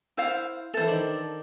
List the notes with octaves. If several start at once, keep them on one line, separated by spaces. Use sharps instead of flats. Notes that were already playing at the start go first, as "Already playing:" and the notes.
E4 C5 F5
E3 A4 C5 E5
D#3 D4